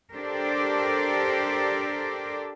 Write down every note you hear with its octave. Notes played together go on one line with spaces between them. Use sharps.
D4 G4 A4 A#4 C5 D5